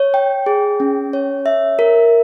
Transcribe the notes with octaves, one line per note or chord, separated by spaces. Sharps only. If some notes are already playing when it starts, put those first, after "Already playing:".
Already playing: C#5
G5
G#4
C#4
C#5
E5
A#4